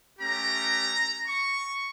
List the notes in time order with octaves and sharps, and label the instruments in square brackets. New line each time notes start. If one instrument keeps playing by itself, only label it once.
[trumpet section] A3 C#4 G4 A#5
C#6